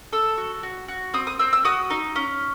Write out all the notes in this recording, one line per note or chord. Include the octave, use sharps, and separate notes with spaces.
A4 E6
F#4
F#4
F#4
C4 D#6
D#6
C4 E6
E6
F#4 D#6
D#4
C#4